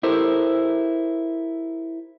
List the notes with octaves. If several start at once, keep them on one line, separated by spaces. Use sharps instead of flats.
E4 G4 A4 A#4 C5 E5